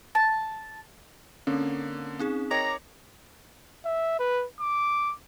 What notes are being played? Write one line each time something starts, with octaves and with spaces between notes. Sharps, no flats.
A5
D3 A#3 C4 C#4
C4 D#4 G#4
A#4 C#5 D#5 G5 A#5 D6 A#6
E5
B4
D6